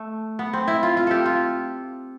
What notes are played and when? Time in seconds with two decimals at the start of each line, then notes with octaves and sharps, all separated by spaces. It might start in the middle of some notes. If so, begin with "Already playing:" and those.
Already playing: A3
0.39 B3
0.53 C4
0.68 E4
0.83 F4
0.97 F4
1.07 G4 A4
1.26 F4